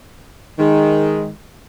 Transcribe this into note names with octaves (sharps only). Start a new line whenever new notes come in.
D#3 G#3